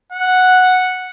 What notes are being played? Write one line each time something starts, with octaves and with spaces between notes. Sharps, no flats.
F#5